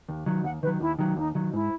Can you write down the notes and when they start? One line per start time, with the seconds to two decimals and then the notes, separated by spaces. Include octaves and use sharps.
0.09 D#2
0.26 D#3 F#3
0.44 D#2 F#5
0.63 D#3 F#3 B4
0.80 D#2 E4
0.99 D#3 F#3
1.17 D#2 D#4
1.35 D#3 F#3
1.53 G#2 E4